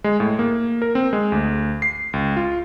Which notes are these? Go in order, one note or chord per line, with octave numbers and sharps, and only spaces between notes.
G#3
A2
A#3
A#4
C4
G#3
D2
C7
C#2
F4